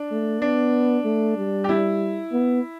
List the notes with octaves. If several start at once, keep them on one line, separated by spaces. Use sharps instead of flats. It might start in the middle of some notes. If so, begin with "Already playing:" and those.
Already playing: D4
A3
B3 D4
A3
G3
G4
E4
B3